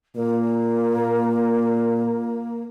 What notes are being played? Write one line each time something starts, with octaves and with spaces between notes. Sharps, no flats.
A#2 A#3